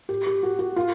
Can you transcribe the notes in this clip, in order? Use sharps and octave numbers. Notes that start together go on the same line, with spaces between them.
G4
G4
F#4
F#4
F4